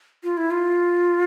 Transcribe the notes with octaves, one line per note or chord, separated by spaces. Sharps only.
F4
E4
F4